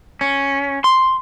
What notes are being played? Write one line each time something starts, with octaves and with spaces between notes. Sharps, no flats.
C#4
C6